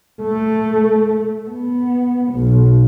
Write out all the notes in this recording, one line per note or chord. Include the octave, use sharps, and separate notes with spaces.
A3
B3
B1